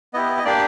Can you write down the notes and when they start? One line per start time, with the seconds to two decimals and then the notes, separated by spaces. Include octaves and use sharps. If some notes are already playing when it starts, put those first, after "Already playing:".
0.14 B3 E4 G4 D#5
0.38 D#5
0.45 A#3 D4 G4 D5